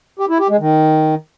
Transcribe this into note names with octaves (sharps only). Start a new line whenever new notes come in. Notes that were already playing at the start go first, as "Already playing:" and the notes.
G4
E4
G4
G#3
D#3